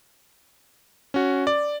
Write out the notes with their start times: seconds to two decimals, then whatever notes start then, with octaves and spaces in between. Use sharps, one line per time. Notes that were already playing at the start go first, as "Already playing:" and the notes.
1.14 C#4 F#4
1.47 D5